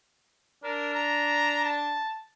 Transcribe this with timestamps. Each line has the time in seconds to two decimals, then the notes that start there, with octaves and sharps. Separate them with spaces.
0.64 D4 A#4
0.95 A#5
1.65 A5